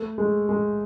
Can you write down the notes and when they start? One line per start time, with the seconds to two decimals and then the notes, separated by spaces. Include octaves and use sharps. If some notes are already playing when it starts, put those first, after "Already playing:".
Already playing: A3
0.18 G#3
0.49 G#3